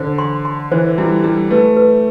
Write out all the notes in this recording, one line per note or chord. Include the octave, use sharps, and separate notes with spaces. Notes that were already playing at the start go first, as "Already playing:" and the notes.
Already playing: D3 C5
C6
C6
E3 C5
G3 E4
G3 E4
A3 B4
B4